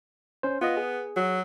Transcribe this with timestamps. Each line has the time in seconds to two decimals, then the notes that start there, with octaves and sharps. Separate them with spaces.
0.43 C#4 C5
0.61 B3 F4 D#5
0.77 G#4
1.16 F#3